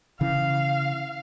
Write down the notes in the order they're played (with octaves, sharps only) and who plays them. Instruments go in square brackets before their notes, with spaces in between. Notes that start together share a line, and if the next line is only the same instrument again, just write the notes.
[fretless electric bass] C#3 E3 [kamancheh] F5